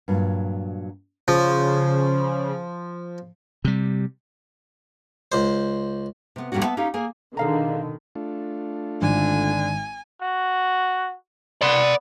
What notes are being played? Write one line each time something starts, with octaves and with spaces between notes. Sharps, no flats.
G2 A#2 F#3
C#3 F3
C3 G3
C#2 C5
C3 B3
F2 A2 G3 A#3 C#4 F#4
B3 E5 A5
C#4 D#4 G4 F5
A#3 G#4 G#5
B2 D3 D#3 G#4 F5 A#5
A3 D4 F4
G#1 D3 G#5
F#4
B3 D5 C6